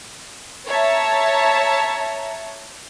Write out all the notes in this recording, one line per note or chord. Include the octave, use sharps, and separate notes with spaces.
C#5 E5 A5 A#5